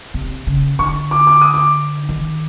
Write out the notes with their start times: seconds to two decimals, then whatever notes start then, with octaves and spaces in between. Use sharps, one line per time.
0.14 C3
0.47 C#3
0.79 D3 C#6
1.11 D6
1.27 D6
1.41 D#6
1.54 D6
2.09 D#3